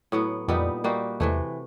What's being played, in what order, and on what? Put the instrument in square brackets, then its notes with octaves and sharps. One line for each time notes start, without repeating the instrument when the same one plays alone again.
[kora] A2 F#3 B3
[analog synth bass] F2 [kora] A#2 G3 B3 D#4
[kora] G3 A#3 D#4 F#4
[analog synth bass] E2 [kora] C3 E3 A3